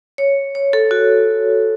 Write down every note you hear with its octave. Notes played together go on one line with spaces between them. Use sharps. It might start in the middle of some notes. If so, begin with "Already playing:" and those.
C#5
C#5
A4
F#4